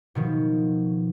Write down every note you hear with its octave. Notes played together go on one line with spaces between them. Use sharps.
B2 D#3 F3